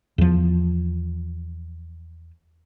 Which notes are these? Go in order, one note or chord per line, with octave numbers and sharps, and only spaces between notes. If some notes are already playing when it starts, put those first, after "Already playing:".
E2 F3